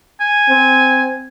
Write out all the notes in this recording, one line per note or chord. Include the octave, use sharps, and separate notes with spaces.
G#5
C4